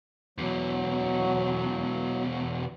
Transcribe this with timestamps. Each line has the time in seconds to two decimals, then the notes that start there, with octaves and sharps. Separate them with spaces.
0.38 E2 B2 F#3